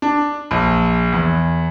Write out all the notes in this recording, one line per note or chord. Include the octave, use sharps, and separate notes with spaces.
D4
A#1
E2